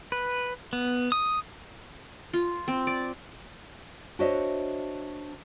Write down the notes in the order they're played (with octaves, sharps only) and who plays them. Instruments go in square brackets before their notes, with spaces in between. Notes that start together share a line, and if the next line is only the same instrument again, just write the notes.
[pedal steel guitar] B4
B3
D#6
[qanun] F4
C4
D5
[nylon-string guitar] D4 F#4 C5 C#5 D#5 E5